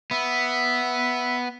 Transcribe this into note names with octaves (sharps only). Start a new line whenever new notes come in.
B3 E5